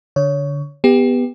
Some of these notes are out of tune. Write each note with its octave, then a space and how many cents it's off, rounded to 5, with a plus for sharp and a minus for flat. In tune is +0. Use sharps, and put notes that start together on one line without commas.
D3 -15 C#5 +15
B3 +0 G4 +25